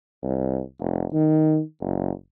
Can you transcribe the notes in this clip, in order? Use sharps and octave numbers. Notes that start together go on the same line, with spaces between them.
C2
F1
D#3
F#1